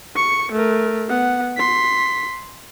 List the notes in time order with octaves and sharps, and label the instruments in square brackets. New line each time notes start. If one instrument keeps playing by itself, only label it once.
[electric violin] C#6 C#7
A3 A#4
B3 F#5
C6 B6